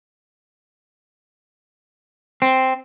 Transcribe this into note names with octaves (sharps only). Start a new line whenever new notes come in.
C4